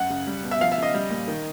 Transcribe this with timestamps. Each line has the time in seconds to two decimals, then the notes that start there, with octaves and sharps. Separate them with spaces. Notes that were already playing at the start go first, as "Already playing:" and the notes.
Already playing: F#2 F#5
0.10 C#3
0.27 G3
0.44 B2
0.51 E5
0.61 F3 F5
0.72 E5
0.78 C#3 D#5
0.94 G3
1.11 A#2
1.28 D#3